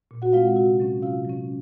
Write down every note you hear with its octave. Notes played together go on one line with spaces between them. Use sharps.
A#2
F#4 F#5
G#3 C4 F4 F5
F#4 F#5
C3 F#4 F#5
F#3 C#4
C3 F4 F5
F#3 C#4